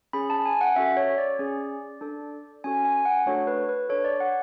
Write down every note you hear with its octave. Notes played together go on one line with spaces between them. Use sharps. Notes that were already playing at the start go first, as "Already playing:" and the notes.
C#4 G#4 B5
A5
G#5
F#5
C#4 F#4 A4 E5
C#5
D5
C#4 G#4
D4 A4
C#4 F#4 A4 G#5
G#5
F#5
A3 D4 F#4 A4 C#5
B4
B4
D4 A4 C#5
D5
F#5